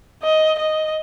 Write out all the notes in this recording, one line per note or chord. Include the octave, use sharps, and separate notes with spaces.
D#5
D#5